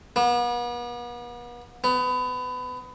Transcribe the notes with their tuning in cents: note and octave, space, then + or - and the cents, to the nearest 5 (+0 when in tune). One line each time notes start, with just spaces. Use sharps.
B3 -40
B3 +25